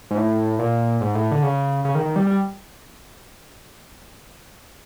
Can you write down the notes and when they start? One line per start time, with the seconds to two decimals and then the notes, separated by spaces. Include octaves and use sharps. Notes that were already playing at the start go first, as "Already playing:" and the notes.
0.11 G#2
0.17 A2
0.59 A#2
1.01 G#2
1.15 A2
1.31 D3
1.43 C#3
1.85 C#3
1.95 D#3
2.06 D#3
2.16 G3
2.27 G3